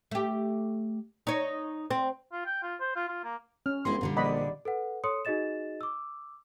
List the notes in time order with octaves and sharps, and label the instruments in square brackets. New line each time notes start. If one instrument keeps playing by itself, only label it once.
[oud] A3 G4
D#4 C#5
C4
[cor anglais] F4
G5
F4
C5
F4
F4
A#3
[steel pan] C#4 [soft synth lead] F6
[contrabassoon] G1 [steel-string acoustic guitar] G#3 C4 E4 [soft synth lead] C6
[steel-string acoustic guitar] A#2 D3 G3
[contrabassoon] A#1 [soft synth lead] D5 [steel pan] D#5 F#5 B5
[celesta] A4 B4 F#5
A4 C#5 C6 D#6 C#7
D#4 F#4 G#4 D#5 A6 E7
D6 E6